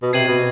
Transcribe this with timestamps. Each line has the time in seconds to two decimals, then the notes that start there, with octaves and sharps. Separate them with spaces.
0.02 B2
0.13 C3 G#6 C7 D#7 F#7
0.28 B2